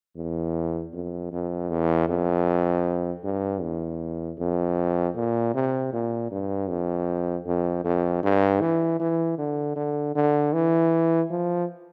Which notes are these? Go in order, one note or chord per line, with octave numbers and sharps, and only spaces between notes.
E2
F2
F2
E2
F2
G2
E2
F2
A#2
C3
A#2
G2
F2
F2
F2
G2
E3
E3
D3
D3
D3
E3
F3